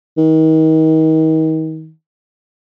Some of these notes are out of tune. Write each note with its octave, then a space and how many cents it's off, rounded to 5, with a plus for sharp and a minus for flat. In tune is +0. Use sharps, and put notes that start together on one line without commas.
D#3 +35